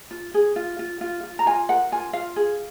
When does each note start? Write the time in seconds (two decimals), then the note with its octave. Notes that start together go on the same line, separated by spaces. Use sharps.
0.11 F4
0.34 G#4
0.56 F4
0.79 F4
1.01 F4
1.23 F4
1.39 A#5
1.46 F4 G#5
1.69 A#4 F#5
1.92 F4 G#5
2.13 F4 F5
2.36 G#4